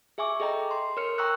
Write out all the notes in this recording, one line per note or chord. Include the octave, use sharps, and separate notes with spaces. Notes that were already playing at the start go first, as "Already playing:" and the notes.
G#4 E5 G#5 C#6 D6
G#4 A4 D#5 G5 A#5
C6
A#4 C#5 F6 C#7
G5 A#5 C#6 D#6 E6 F#6